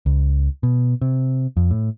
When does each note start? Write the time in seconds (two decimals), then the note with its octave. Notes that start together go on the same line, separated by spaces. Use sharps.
0.06 C#2
0.63 B2
1.01 C3
1.57 F2
1.71 A2